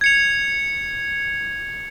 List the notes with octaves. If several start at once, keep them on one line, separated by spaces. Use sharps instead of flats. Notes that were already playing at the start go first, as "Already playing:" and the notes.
G#6 C#7 F7